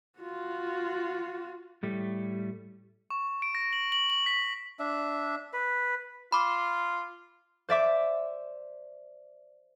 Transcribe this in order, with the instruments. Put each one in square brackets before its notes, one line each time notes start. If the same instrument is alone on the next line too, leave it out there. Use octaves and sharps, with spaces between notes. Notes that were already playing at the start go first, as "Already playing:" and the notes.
[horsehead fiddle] F4 F#4
[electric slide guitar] A2 G3 A3
[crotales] C#6
D7
A#6
F#7
F#7
F#7
B6
[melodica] D4 E5
B4
[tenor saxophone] F4 [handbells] B5 D6
[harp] C5 D5 E5 D6